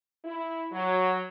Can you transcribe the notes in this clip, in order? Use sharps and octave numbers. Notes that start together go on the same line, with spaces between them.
E4
F#3